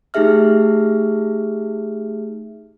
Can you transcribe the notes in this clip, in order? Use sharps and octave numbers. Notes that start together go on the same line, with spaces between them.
A3 D#4 G4 G#4 E5 F6